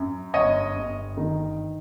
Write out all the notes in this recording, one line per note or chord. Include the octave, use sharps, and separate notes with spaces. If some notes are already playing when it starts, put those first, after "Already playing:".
Already playing: F#2
G1 C#5 D#5
G1
D#3